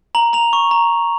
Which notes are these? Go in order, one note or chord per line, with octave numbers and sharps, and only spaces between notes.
A#5 F#7
A#5 F7
C#6
A#5